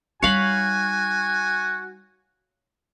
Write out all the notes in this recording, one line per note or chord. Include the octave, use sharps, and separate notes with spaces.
G3 D#4 F#4 C#5 F5 G#5 B5